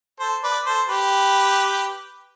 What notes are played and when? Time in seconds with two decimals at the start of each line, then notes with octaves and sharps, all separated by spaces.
0.20 A4 C5
0.44 B4 D5
0.66 A4 C5
0.89 G4 B4